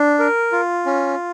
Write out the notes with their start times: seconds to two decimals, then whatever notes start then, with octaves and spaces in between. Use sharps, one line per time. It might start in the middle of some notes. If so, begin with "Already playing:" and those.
Already playing: D4
0.19 A#4
0.52 F4
0.86 C#4